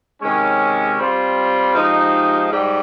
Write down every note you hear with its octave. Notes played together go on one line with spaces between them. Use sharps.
C3 D#3 G#3 C#4
G3 C4 F4
F3 G#3 D#4 G4
G#2 G3